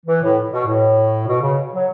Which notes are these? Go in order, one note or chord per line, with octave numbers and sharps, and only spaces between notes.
E3
A2
B2
A2
B2
C#3
F#3